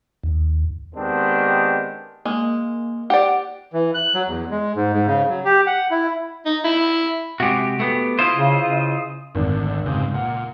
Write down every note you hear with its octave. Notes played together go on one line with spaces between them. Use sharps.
D#2
D#3 G#3 B3 C4 D4 G4
G#3 A#3
G4 D5 F#5
E3
F#6
F#3
E2
G#3
G#2
G#2
C#3
F#3
G4
F#5
E4
D#4
E4
C3 G#3 F#4 G4
A3 B3
E4 F4 C5 D#5
C#3
C#3
G#1 D2
C#2 G#2 C3
A#2 F#5